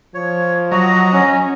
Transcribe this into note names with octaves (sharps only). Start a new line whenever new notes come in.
F3 C#5
F#3 F#4 D#5 A#5
C#4